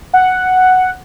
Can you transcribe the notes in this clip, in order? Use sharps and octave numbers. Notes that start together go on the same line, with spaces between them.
F#5